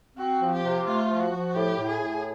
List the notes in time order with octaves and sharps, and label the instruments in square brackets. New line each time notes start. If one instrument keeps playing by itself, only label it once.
[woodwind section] C4 [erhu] F#4
[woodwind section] F3
[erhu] G4
[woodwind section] C3
[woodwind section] A3 [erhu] F4
[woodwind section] F3
[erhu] F#4
[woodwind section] F3
[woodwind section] A2 [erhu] G4
[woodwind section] A2
[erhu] G#4
[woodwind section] A2